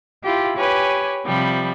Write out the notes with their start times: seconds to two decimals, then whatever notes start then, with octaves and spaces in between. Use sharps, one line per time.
0.24 E4 F4 G4
0.58 G4 B4 C#5 G#5
1.26 C3 F3 G3 B5